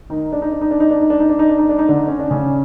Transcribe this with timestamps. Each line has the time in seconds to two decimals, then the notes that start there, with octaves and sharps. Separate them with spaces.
0.10 D#3 D#4
0.32 D4
0.42 D#4
0.52 D4
0.61 D#4
0.71 D4
0.80 D#4
0.91 D4
1.01 D#4
1.10 D4
1.20 D#4
1.29 D4
1.39 D#4
1.49 D4
1.59 D#4
1.69 D4
1.79 D#4
1.88 D3 D4
2.08 C#4
2.19 D4
2.30 C#3 C#4